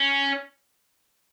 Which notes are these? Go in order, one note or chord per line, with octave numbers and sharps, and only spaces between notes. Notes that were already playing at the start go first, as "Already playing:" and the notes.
Already playing: C#4